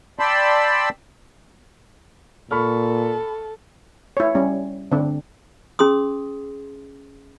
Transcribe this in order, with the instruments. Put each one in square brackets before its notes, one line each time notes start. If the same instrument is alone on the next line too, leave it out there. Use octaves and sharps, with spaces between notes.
[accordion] D5 G5 A5 B5 C6 E6
[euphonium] A#2 [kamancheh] A4 [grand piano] B5 C#6 F6
[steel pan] E4 C#5
G3 C#4
D3 C4 D4
[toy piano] C#4 G#4 C6 D#6